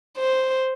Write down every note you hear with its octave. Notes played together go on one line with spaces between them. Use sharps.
C5